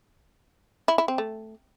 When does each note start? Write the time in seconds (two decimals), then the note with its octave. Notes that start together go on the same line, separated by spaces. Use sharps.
0.88 E4
0.98 E4
1.08 C4
1.18 A3